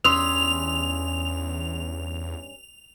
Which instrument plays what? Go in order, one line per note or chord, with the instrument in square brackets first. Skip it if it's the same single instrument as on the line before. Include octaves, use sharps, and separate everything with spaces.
[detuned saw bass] E2 [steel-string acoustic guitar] G2 C#4 [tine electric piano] C6 D#6 E6 [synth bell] F7